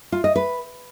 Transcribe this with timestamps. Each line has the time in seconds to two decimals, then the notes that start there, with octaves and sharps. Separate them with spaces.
0.12 F4
0.24 D#5
0.36 B4